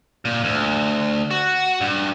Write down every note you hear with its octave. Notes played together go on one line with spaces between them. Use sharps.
A#2
D2
F#4
G2